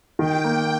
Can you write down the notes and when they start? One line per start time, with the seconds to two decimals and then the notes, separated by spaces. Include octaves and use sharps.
0.19 D#3 G5
0.44 A#3